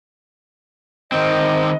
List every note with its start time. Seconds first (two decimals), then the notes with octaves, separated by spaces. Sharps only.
1.12 D#3 C4 D#5